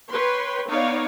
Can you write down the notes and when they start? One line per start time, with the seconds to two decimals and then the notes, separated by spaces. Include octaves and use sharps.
0.11 B4 C#5 G5 C6
0.69 B3 D#4 C#5 D5 F5